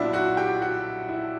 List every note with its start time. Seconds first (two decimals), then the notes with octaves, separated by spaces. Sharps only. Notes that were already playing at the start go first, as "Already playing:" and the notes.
Already playing: B1 A#2 F#3 B3 D4 E4 E5
0.13 F#4 F#5
0.37 G4 G5
0.61 F#4 F#5
1.08 E4 E5